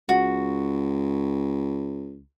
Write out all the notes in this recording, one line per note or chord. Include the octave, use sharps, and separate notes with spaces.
C#2 F#4